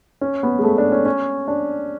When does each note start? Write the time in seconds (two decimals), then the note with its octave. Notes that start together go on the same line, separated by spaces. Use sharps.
0.21 C#4
0.43 B3
0.59 G#3
0.64 A3
0.78 D4
0.92 C#4
1.05 C#4
1.48 D4